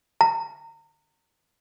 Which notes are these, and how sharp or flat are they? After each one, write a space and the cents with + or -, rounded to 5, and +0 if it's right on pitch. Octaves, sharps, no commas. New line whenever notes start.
A#5 -35